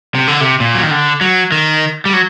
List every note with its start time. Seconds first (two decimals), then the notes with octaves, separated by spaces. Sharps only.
0.15 C3
0.28 D3
0.41 C3
0.60 A#2
0.75 F#3
0.83 D#3
0.91 D3
1.21 F#3
1.52 D#3
2.06 G3
2.13 F#3